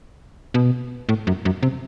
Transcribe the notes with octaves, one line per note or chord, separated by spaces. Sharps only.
B2
A2
F#2
F#2
C3